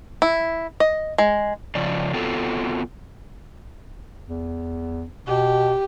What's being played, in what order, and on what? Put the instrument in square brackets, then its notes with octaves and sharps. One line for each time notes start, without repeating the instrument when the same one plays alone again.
[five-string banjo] E4
D#5
G#3
[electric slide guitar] C#3 F3 D5
B3 C4 F4 F#4 A4
[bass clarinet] E2
[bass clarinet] B2 [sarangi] G4